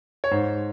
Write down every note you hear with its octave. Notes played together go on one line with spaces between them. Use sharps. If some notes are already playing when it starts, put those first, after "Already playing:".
C#5
G#2 C5